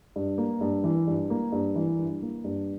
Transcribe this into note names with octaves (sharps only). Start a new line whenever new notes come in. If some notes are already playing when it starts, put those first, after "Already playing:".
G2
A#3
G2
E3
G2
A#3
G2
E3
G2
A#3
G2